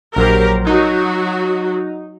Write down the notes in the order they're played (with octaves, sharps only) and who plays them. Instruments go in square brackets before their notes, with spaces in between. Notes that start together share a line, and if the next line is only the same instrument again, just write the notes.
[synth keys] A#1 F#3 C5 [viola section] G4 A#4
[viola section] F#3 F#4 [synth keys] D#4